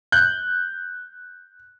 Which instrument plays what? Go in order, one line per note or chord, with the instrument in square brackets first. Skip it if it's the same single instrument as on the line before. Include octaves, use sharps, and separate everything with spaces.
[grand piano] F#6 G6